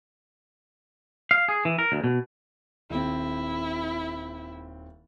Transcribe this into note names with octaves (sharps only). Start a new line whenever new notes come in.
F5
G#4
E3
A#4
D2
B2
D#1 C4 E4